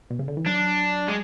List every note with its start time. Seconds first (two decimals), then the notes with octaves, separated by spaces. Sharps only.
0.10 B2
0.19 C#3
0.28 D3
0.37 E3
0.46 F#3 D4
1.08 G#3